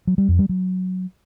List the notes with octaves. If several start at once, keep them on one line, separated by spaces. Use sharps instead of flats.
F#3
G3
F2
G3
F#3